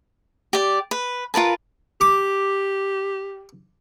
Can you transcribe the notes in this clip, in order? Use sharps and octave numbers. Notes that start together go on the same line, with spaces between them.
G4 D5
B4
F4 A#4 B4 A5
G4 D6